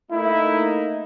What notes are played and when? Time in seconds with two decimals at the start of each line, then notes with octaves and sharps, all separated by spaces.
0.11 A3 A#3 D#4 E4